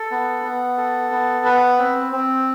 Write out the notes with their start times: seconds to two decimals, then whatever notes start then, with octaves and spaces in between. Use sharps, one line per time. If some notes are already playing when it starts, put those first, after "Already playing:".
Already playing: A4
0.11 B3
0.44 B3
0.78 A4
1.11 B3
1.45 B4
1.79 C4
2.12 C4